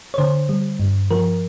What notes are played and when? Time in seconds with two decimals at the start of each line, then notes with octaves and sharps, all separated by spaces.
0.14 C#5
0.18 D3 C5
0.49 G3
0.80 G2
1.11 F3 A#4